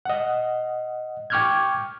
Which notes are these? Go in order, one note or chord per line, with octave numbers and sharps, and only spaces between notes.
D#5 F#5
G5 C#6 D6 F6 G6 G#6